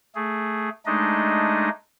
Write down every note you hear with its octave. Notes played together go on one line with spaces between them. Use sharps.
A3 G#4
G#3 A3 D4 D#4 D#5